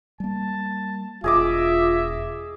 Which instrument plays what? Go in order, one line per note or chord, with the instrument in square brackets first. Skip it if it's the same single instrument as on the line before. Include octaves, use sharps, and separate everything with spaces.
[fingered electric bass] G3 A#3 [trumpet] A5
[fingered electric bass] E1 [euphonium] F4 [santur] G#4 D#5 D6 [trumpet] E5